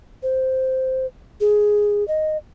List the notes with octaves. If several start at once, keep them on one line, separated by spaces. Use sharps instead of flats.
C5
G#4
D#5